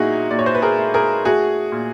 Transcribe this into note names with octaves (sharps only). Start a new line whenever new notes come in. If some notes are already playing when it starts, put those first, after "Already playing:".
Already playing: A#2 F#3 D#4 E4 F#4 G#4
A#2 D5
C#5
C5
B4
G#4 A#4
A3
G#4 A#4
A3 F#4 G#4
A#2